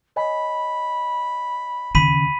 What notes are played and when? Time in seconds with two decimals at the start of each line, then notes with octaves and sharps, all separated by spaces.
0.16 C#5 D#5 G#5 B5
1.95 D#2 C#3 B5 B6 D#7